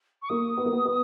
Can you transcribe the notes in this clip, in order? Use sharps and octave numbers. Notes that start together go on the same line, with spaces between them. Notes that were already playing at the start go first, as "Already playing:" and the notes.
C#6
A#3 D#6
B3
A#3
B3
B3